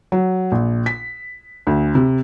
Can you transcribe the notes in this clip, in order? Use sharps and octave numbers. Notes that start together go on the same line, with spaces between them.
F#3
A#1
B6
D2
C3